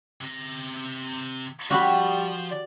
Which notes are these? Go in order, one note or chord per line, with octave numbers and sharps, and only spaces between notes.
C3 A#5
F3 G3 F#4 G4 B5
D5